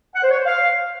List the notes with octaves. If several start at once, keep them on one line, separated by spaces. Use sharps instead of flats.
F#5
C5
C#5
C5
F5